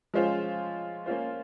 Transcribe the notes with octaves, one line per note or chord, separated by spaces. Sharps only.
F3 G#3 C#4 F4 C5
A#3 C#4 F4 C5